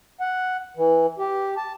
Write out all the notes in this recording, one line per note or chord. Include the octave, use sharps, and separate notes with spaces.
F#5
E3
G4
A5